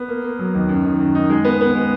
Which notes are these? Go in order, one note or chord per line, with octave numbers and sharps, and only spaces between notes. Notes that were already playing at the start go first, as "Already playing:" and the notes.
Already playing: B3
A#3
A#3
F#3
D#2
F#2
D#3
F#2
D#4
G#3
B3
B3
G#3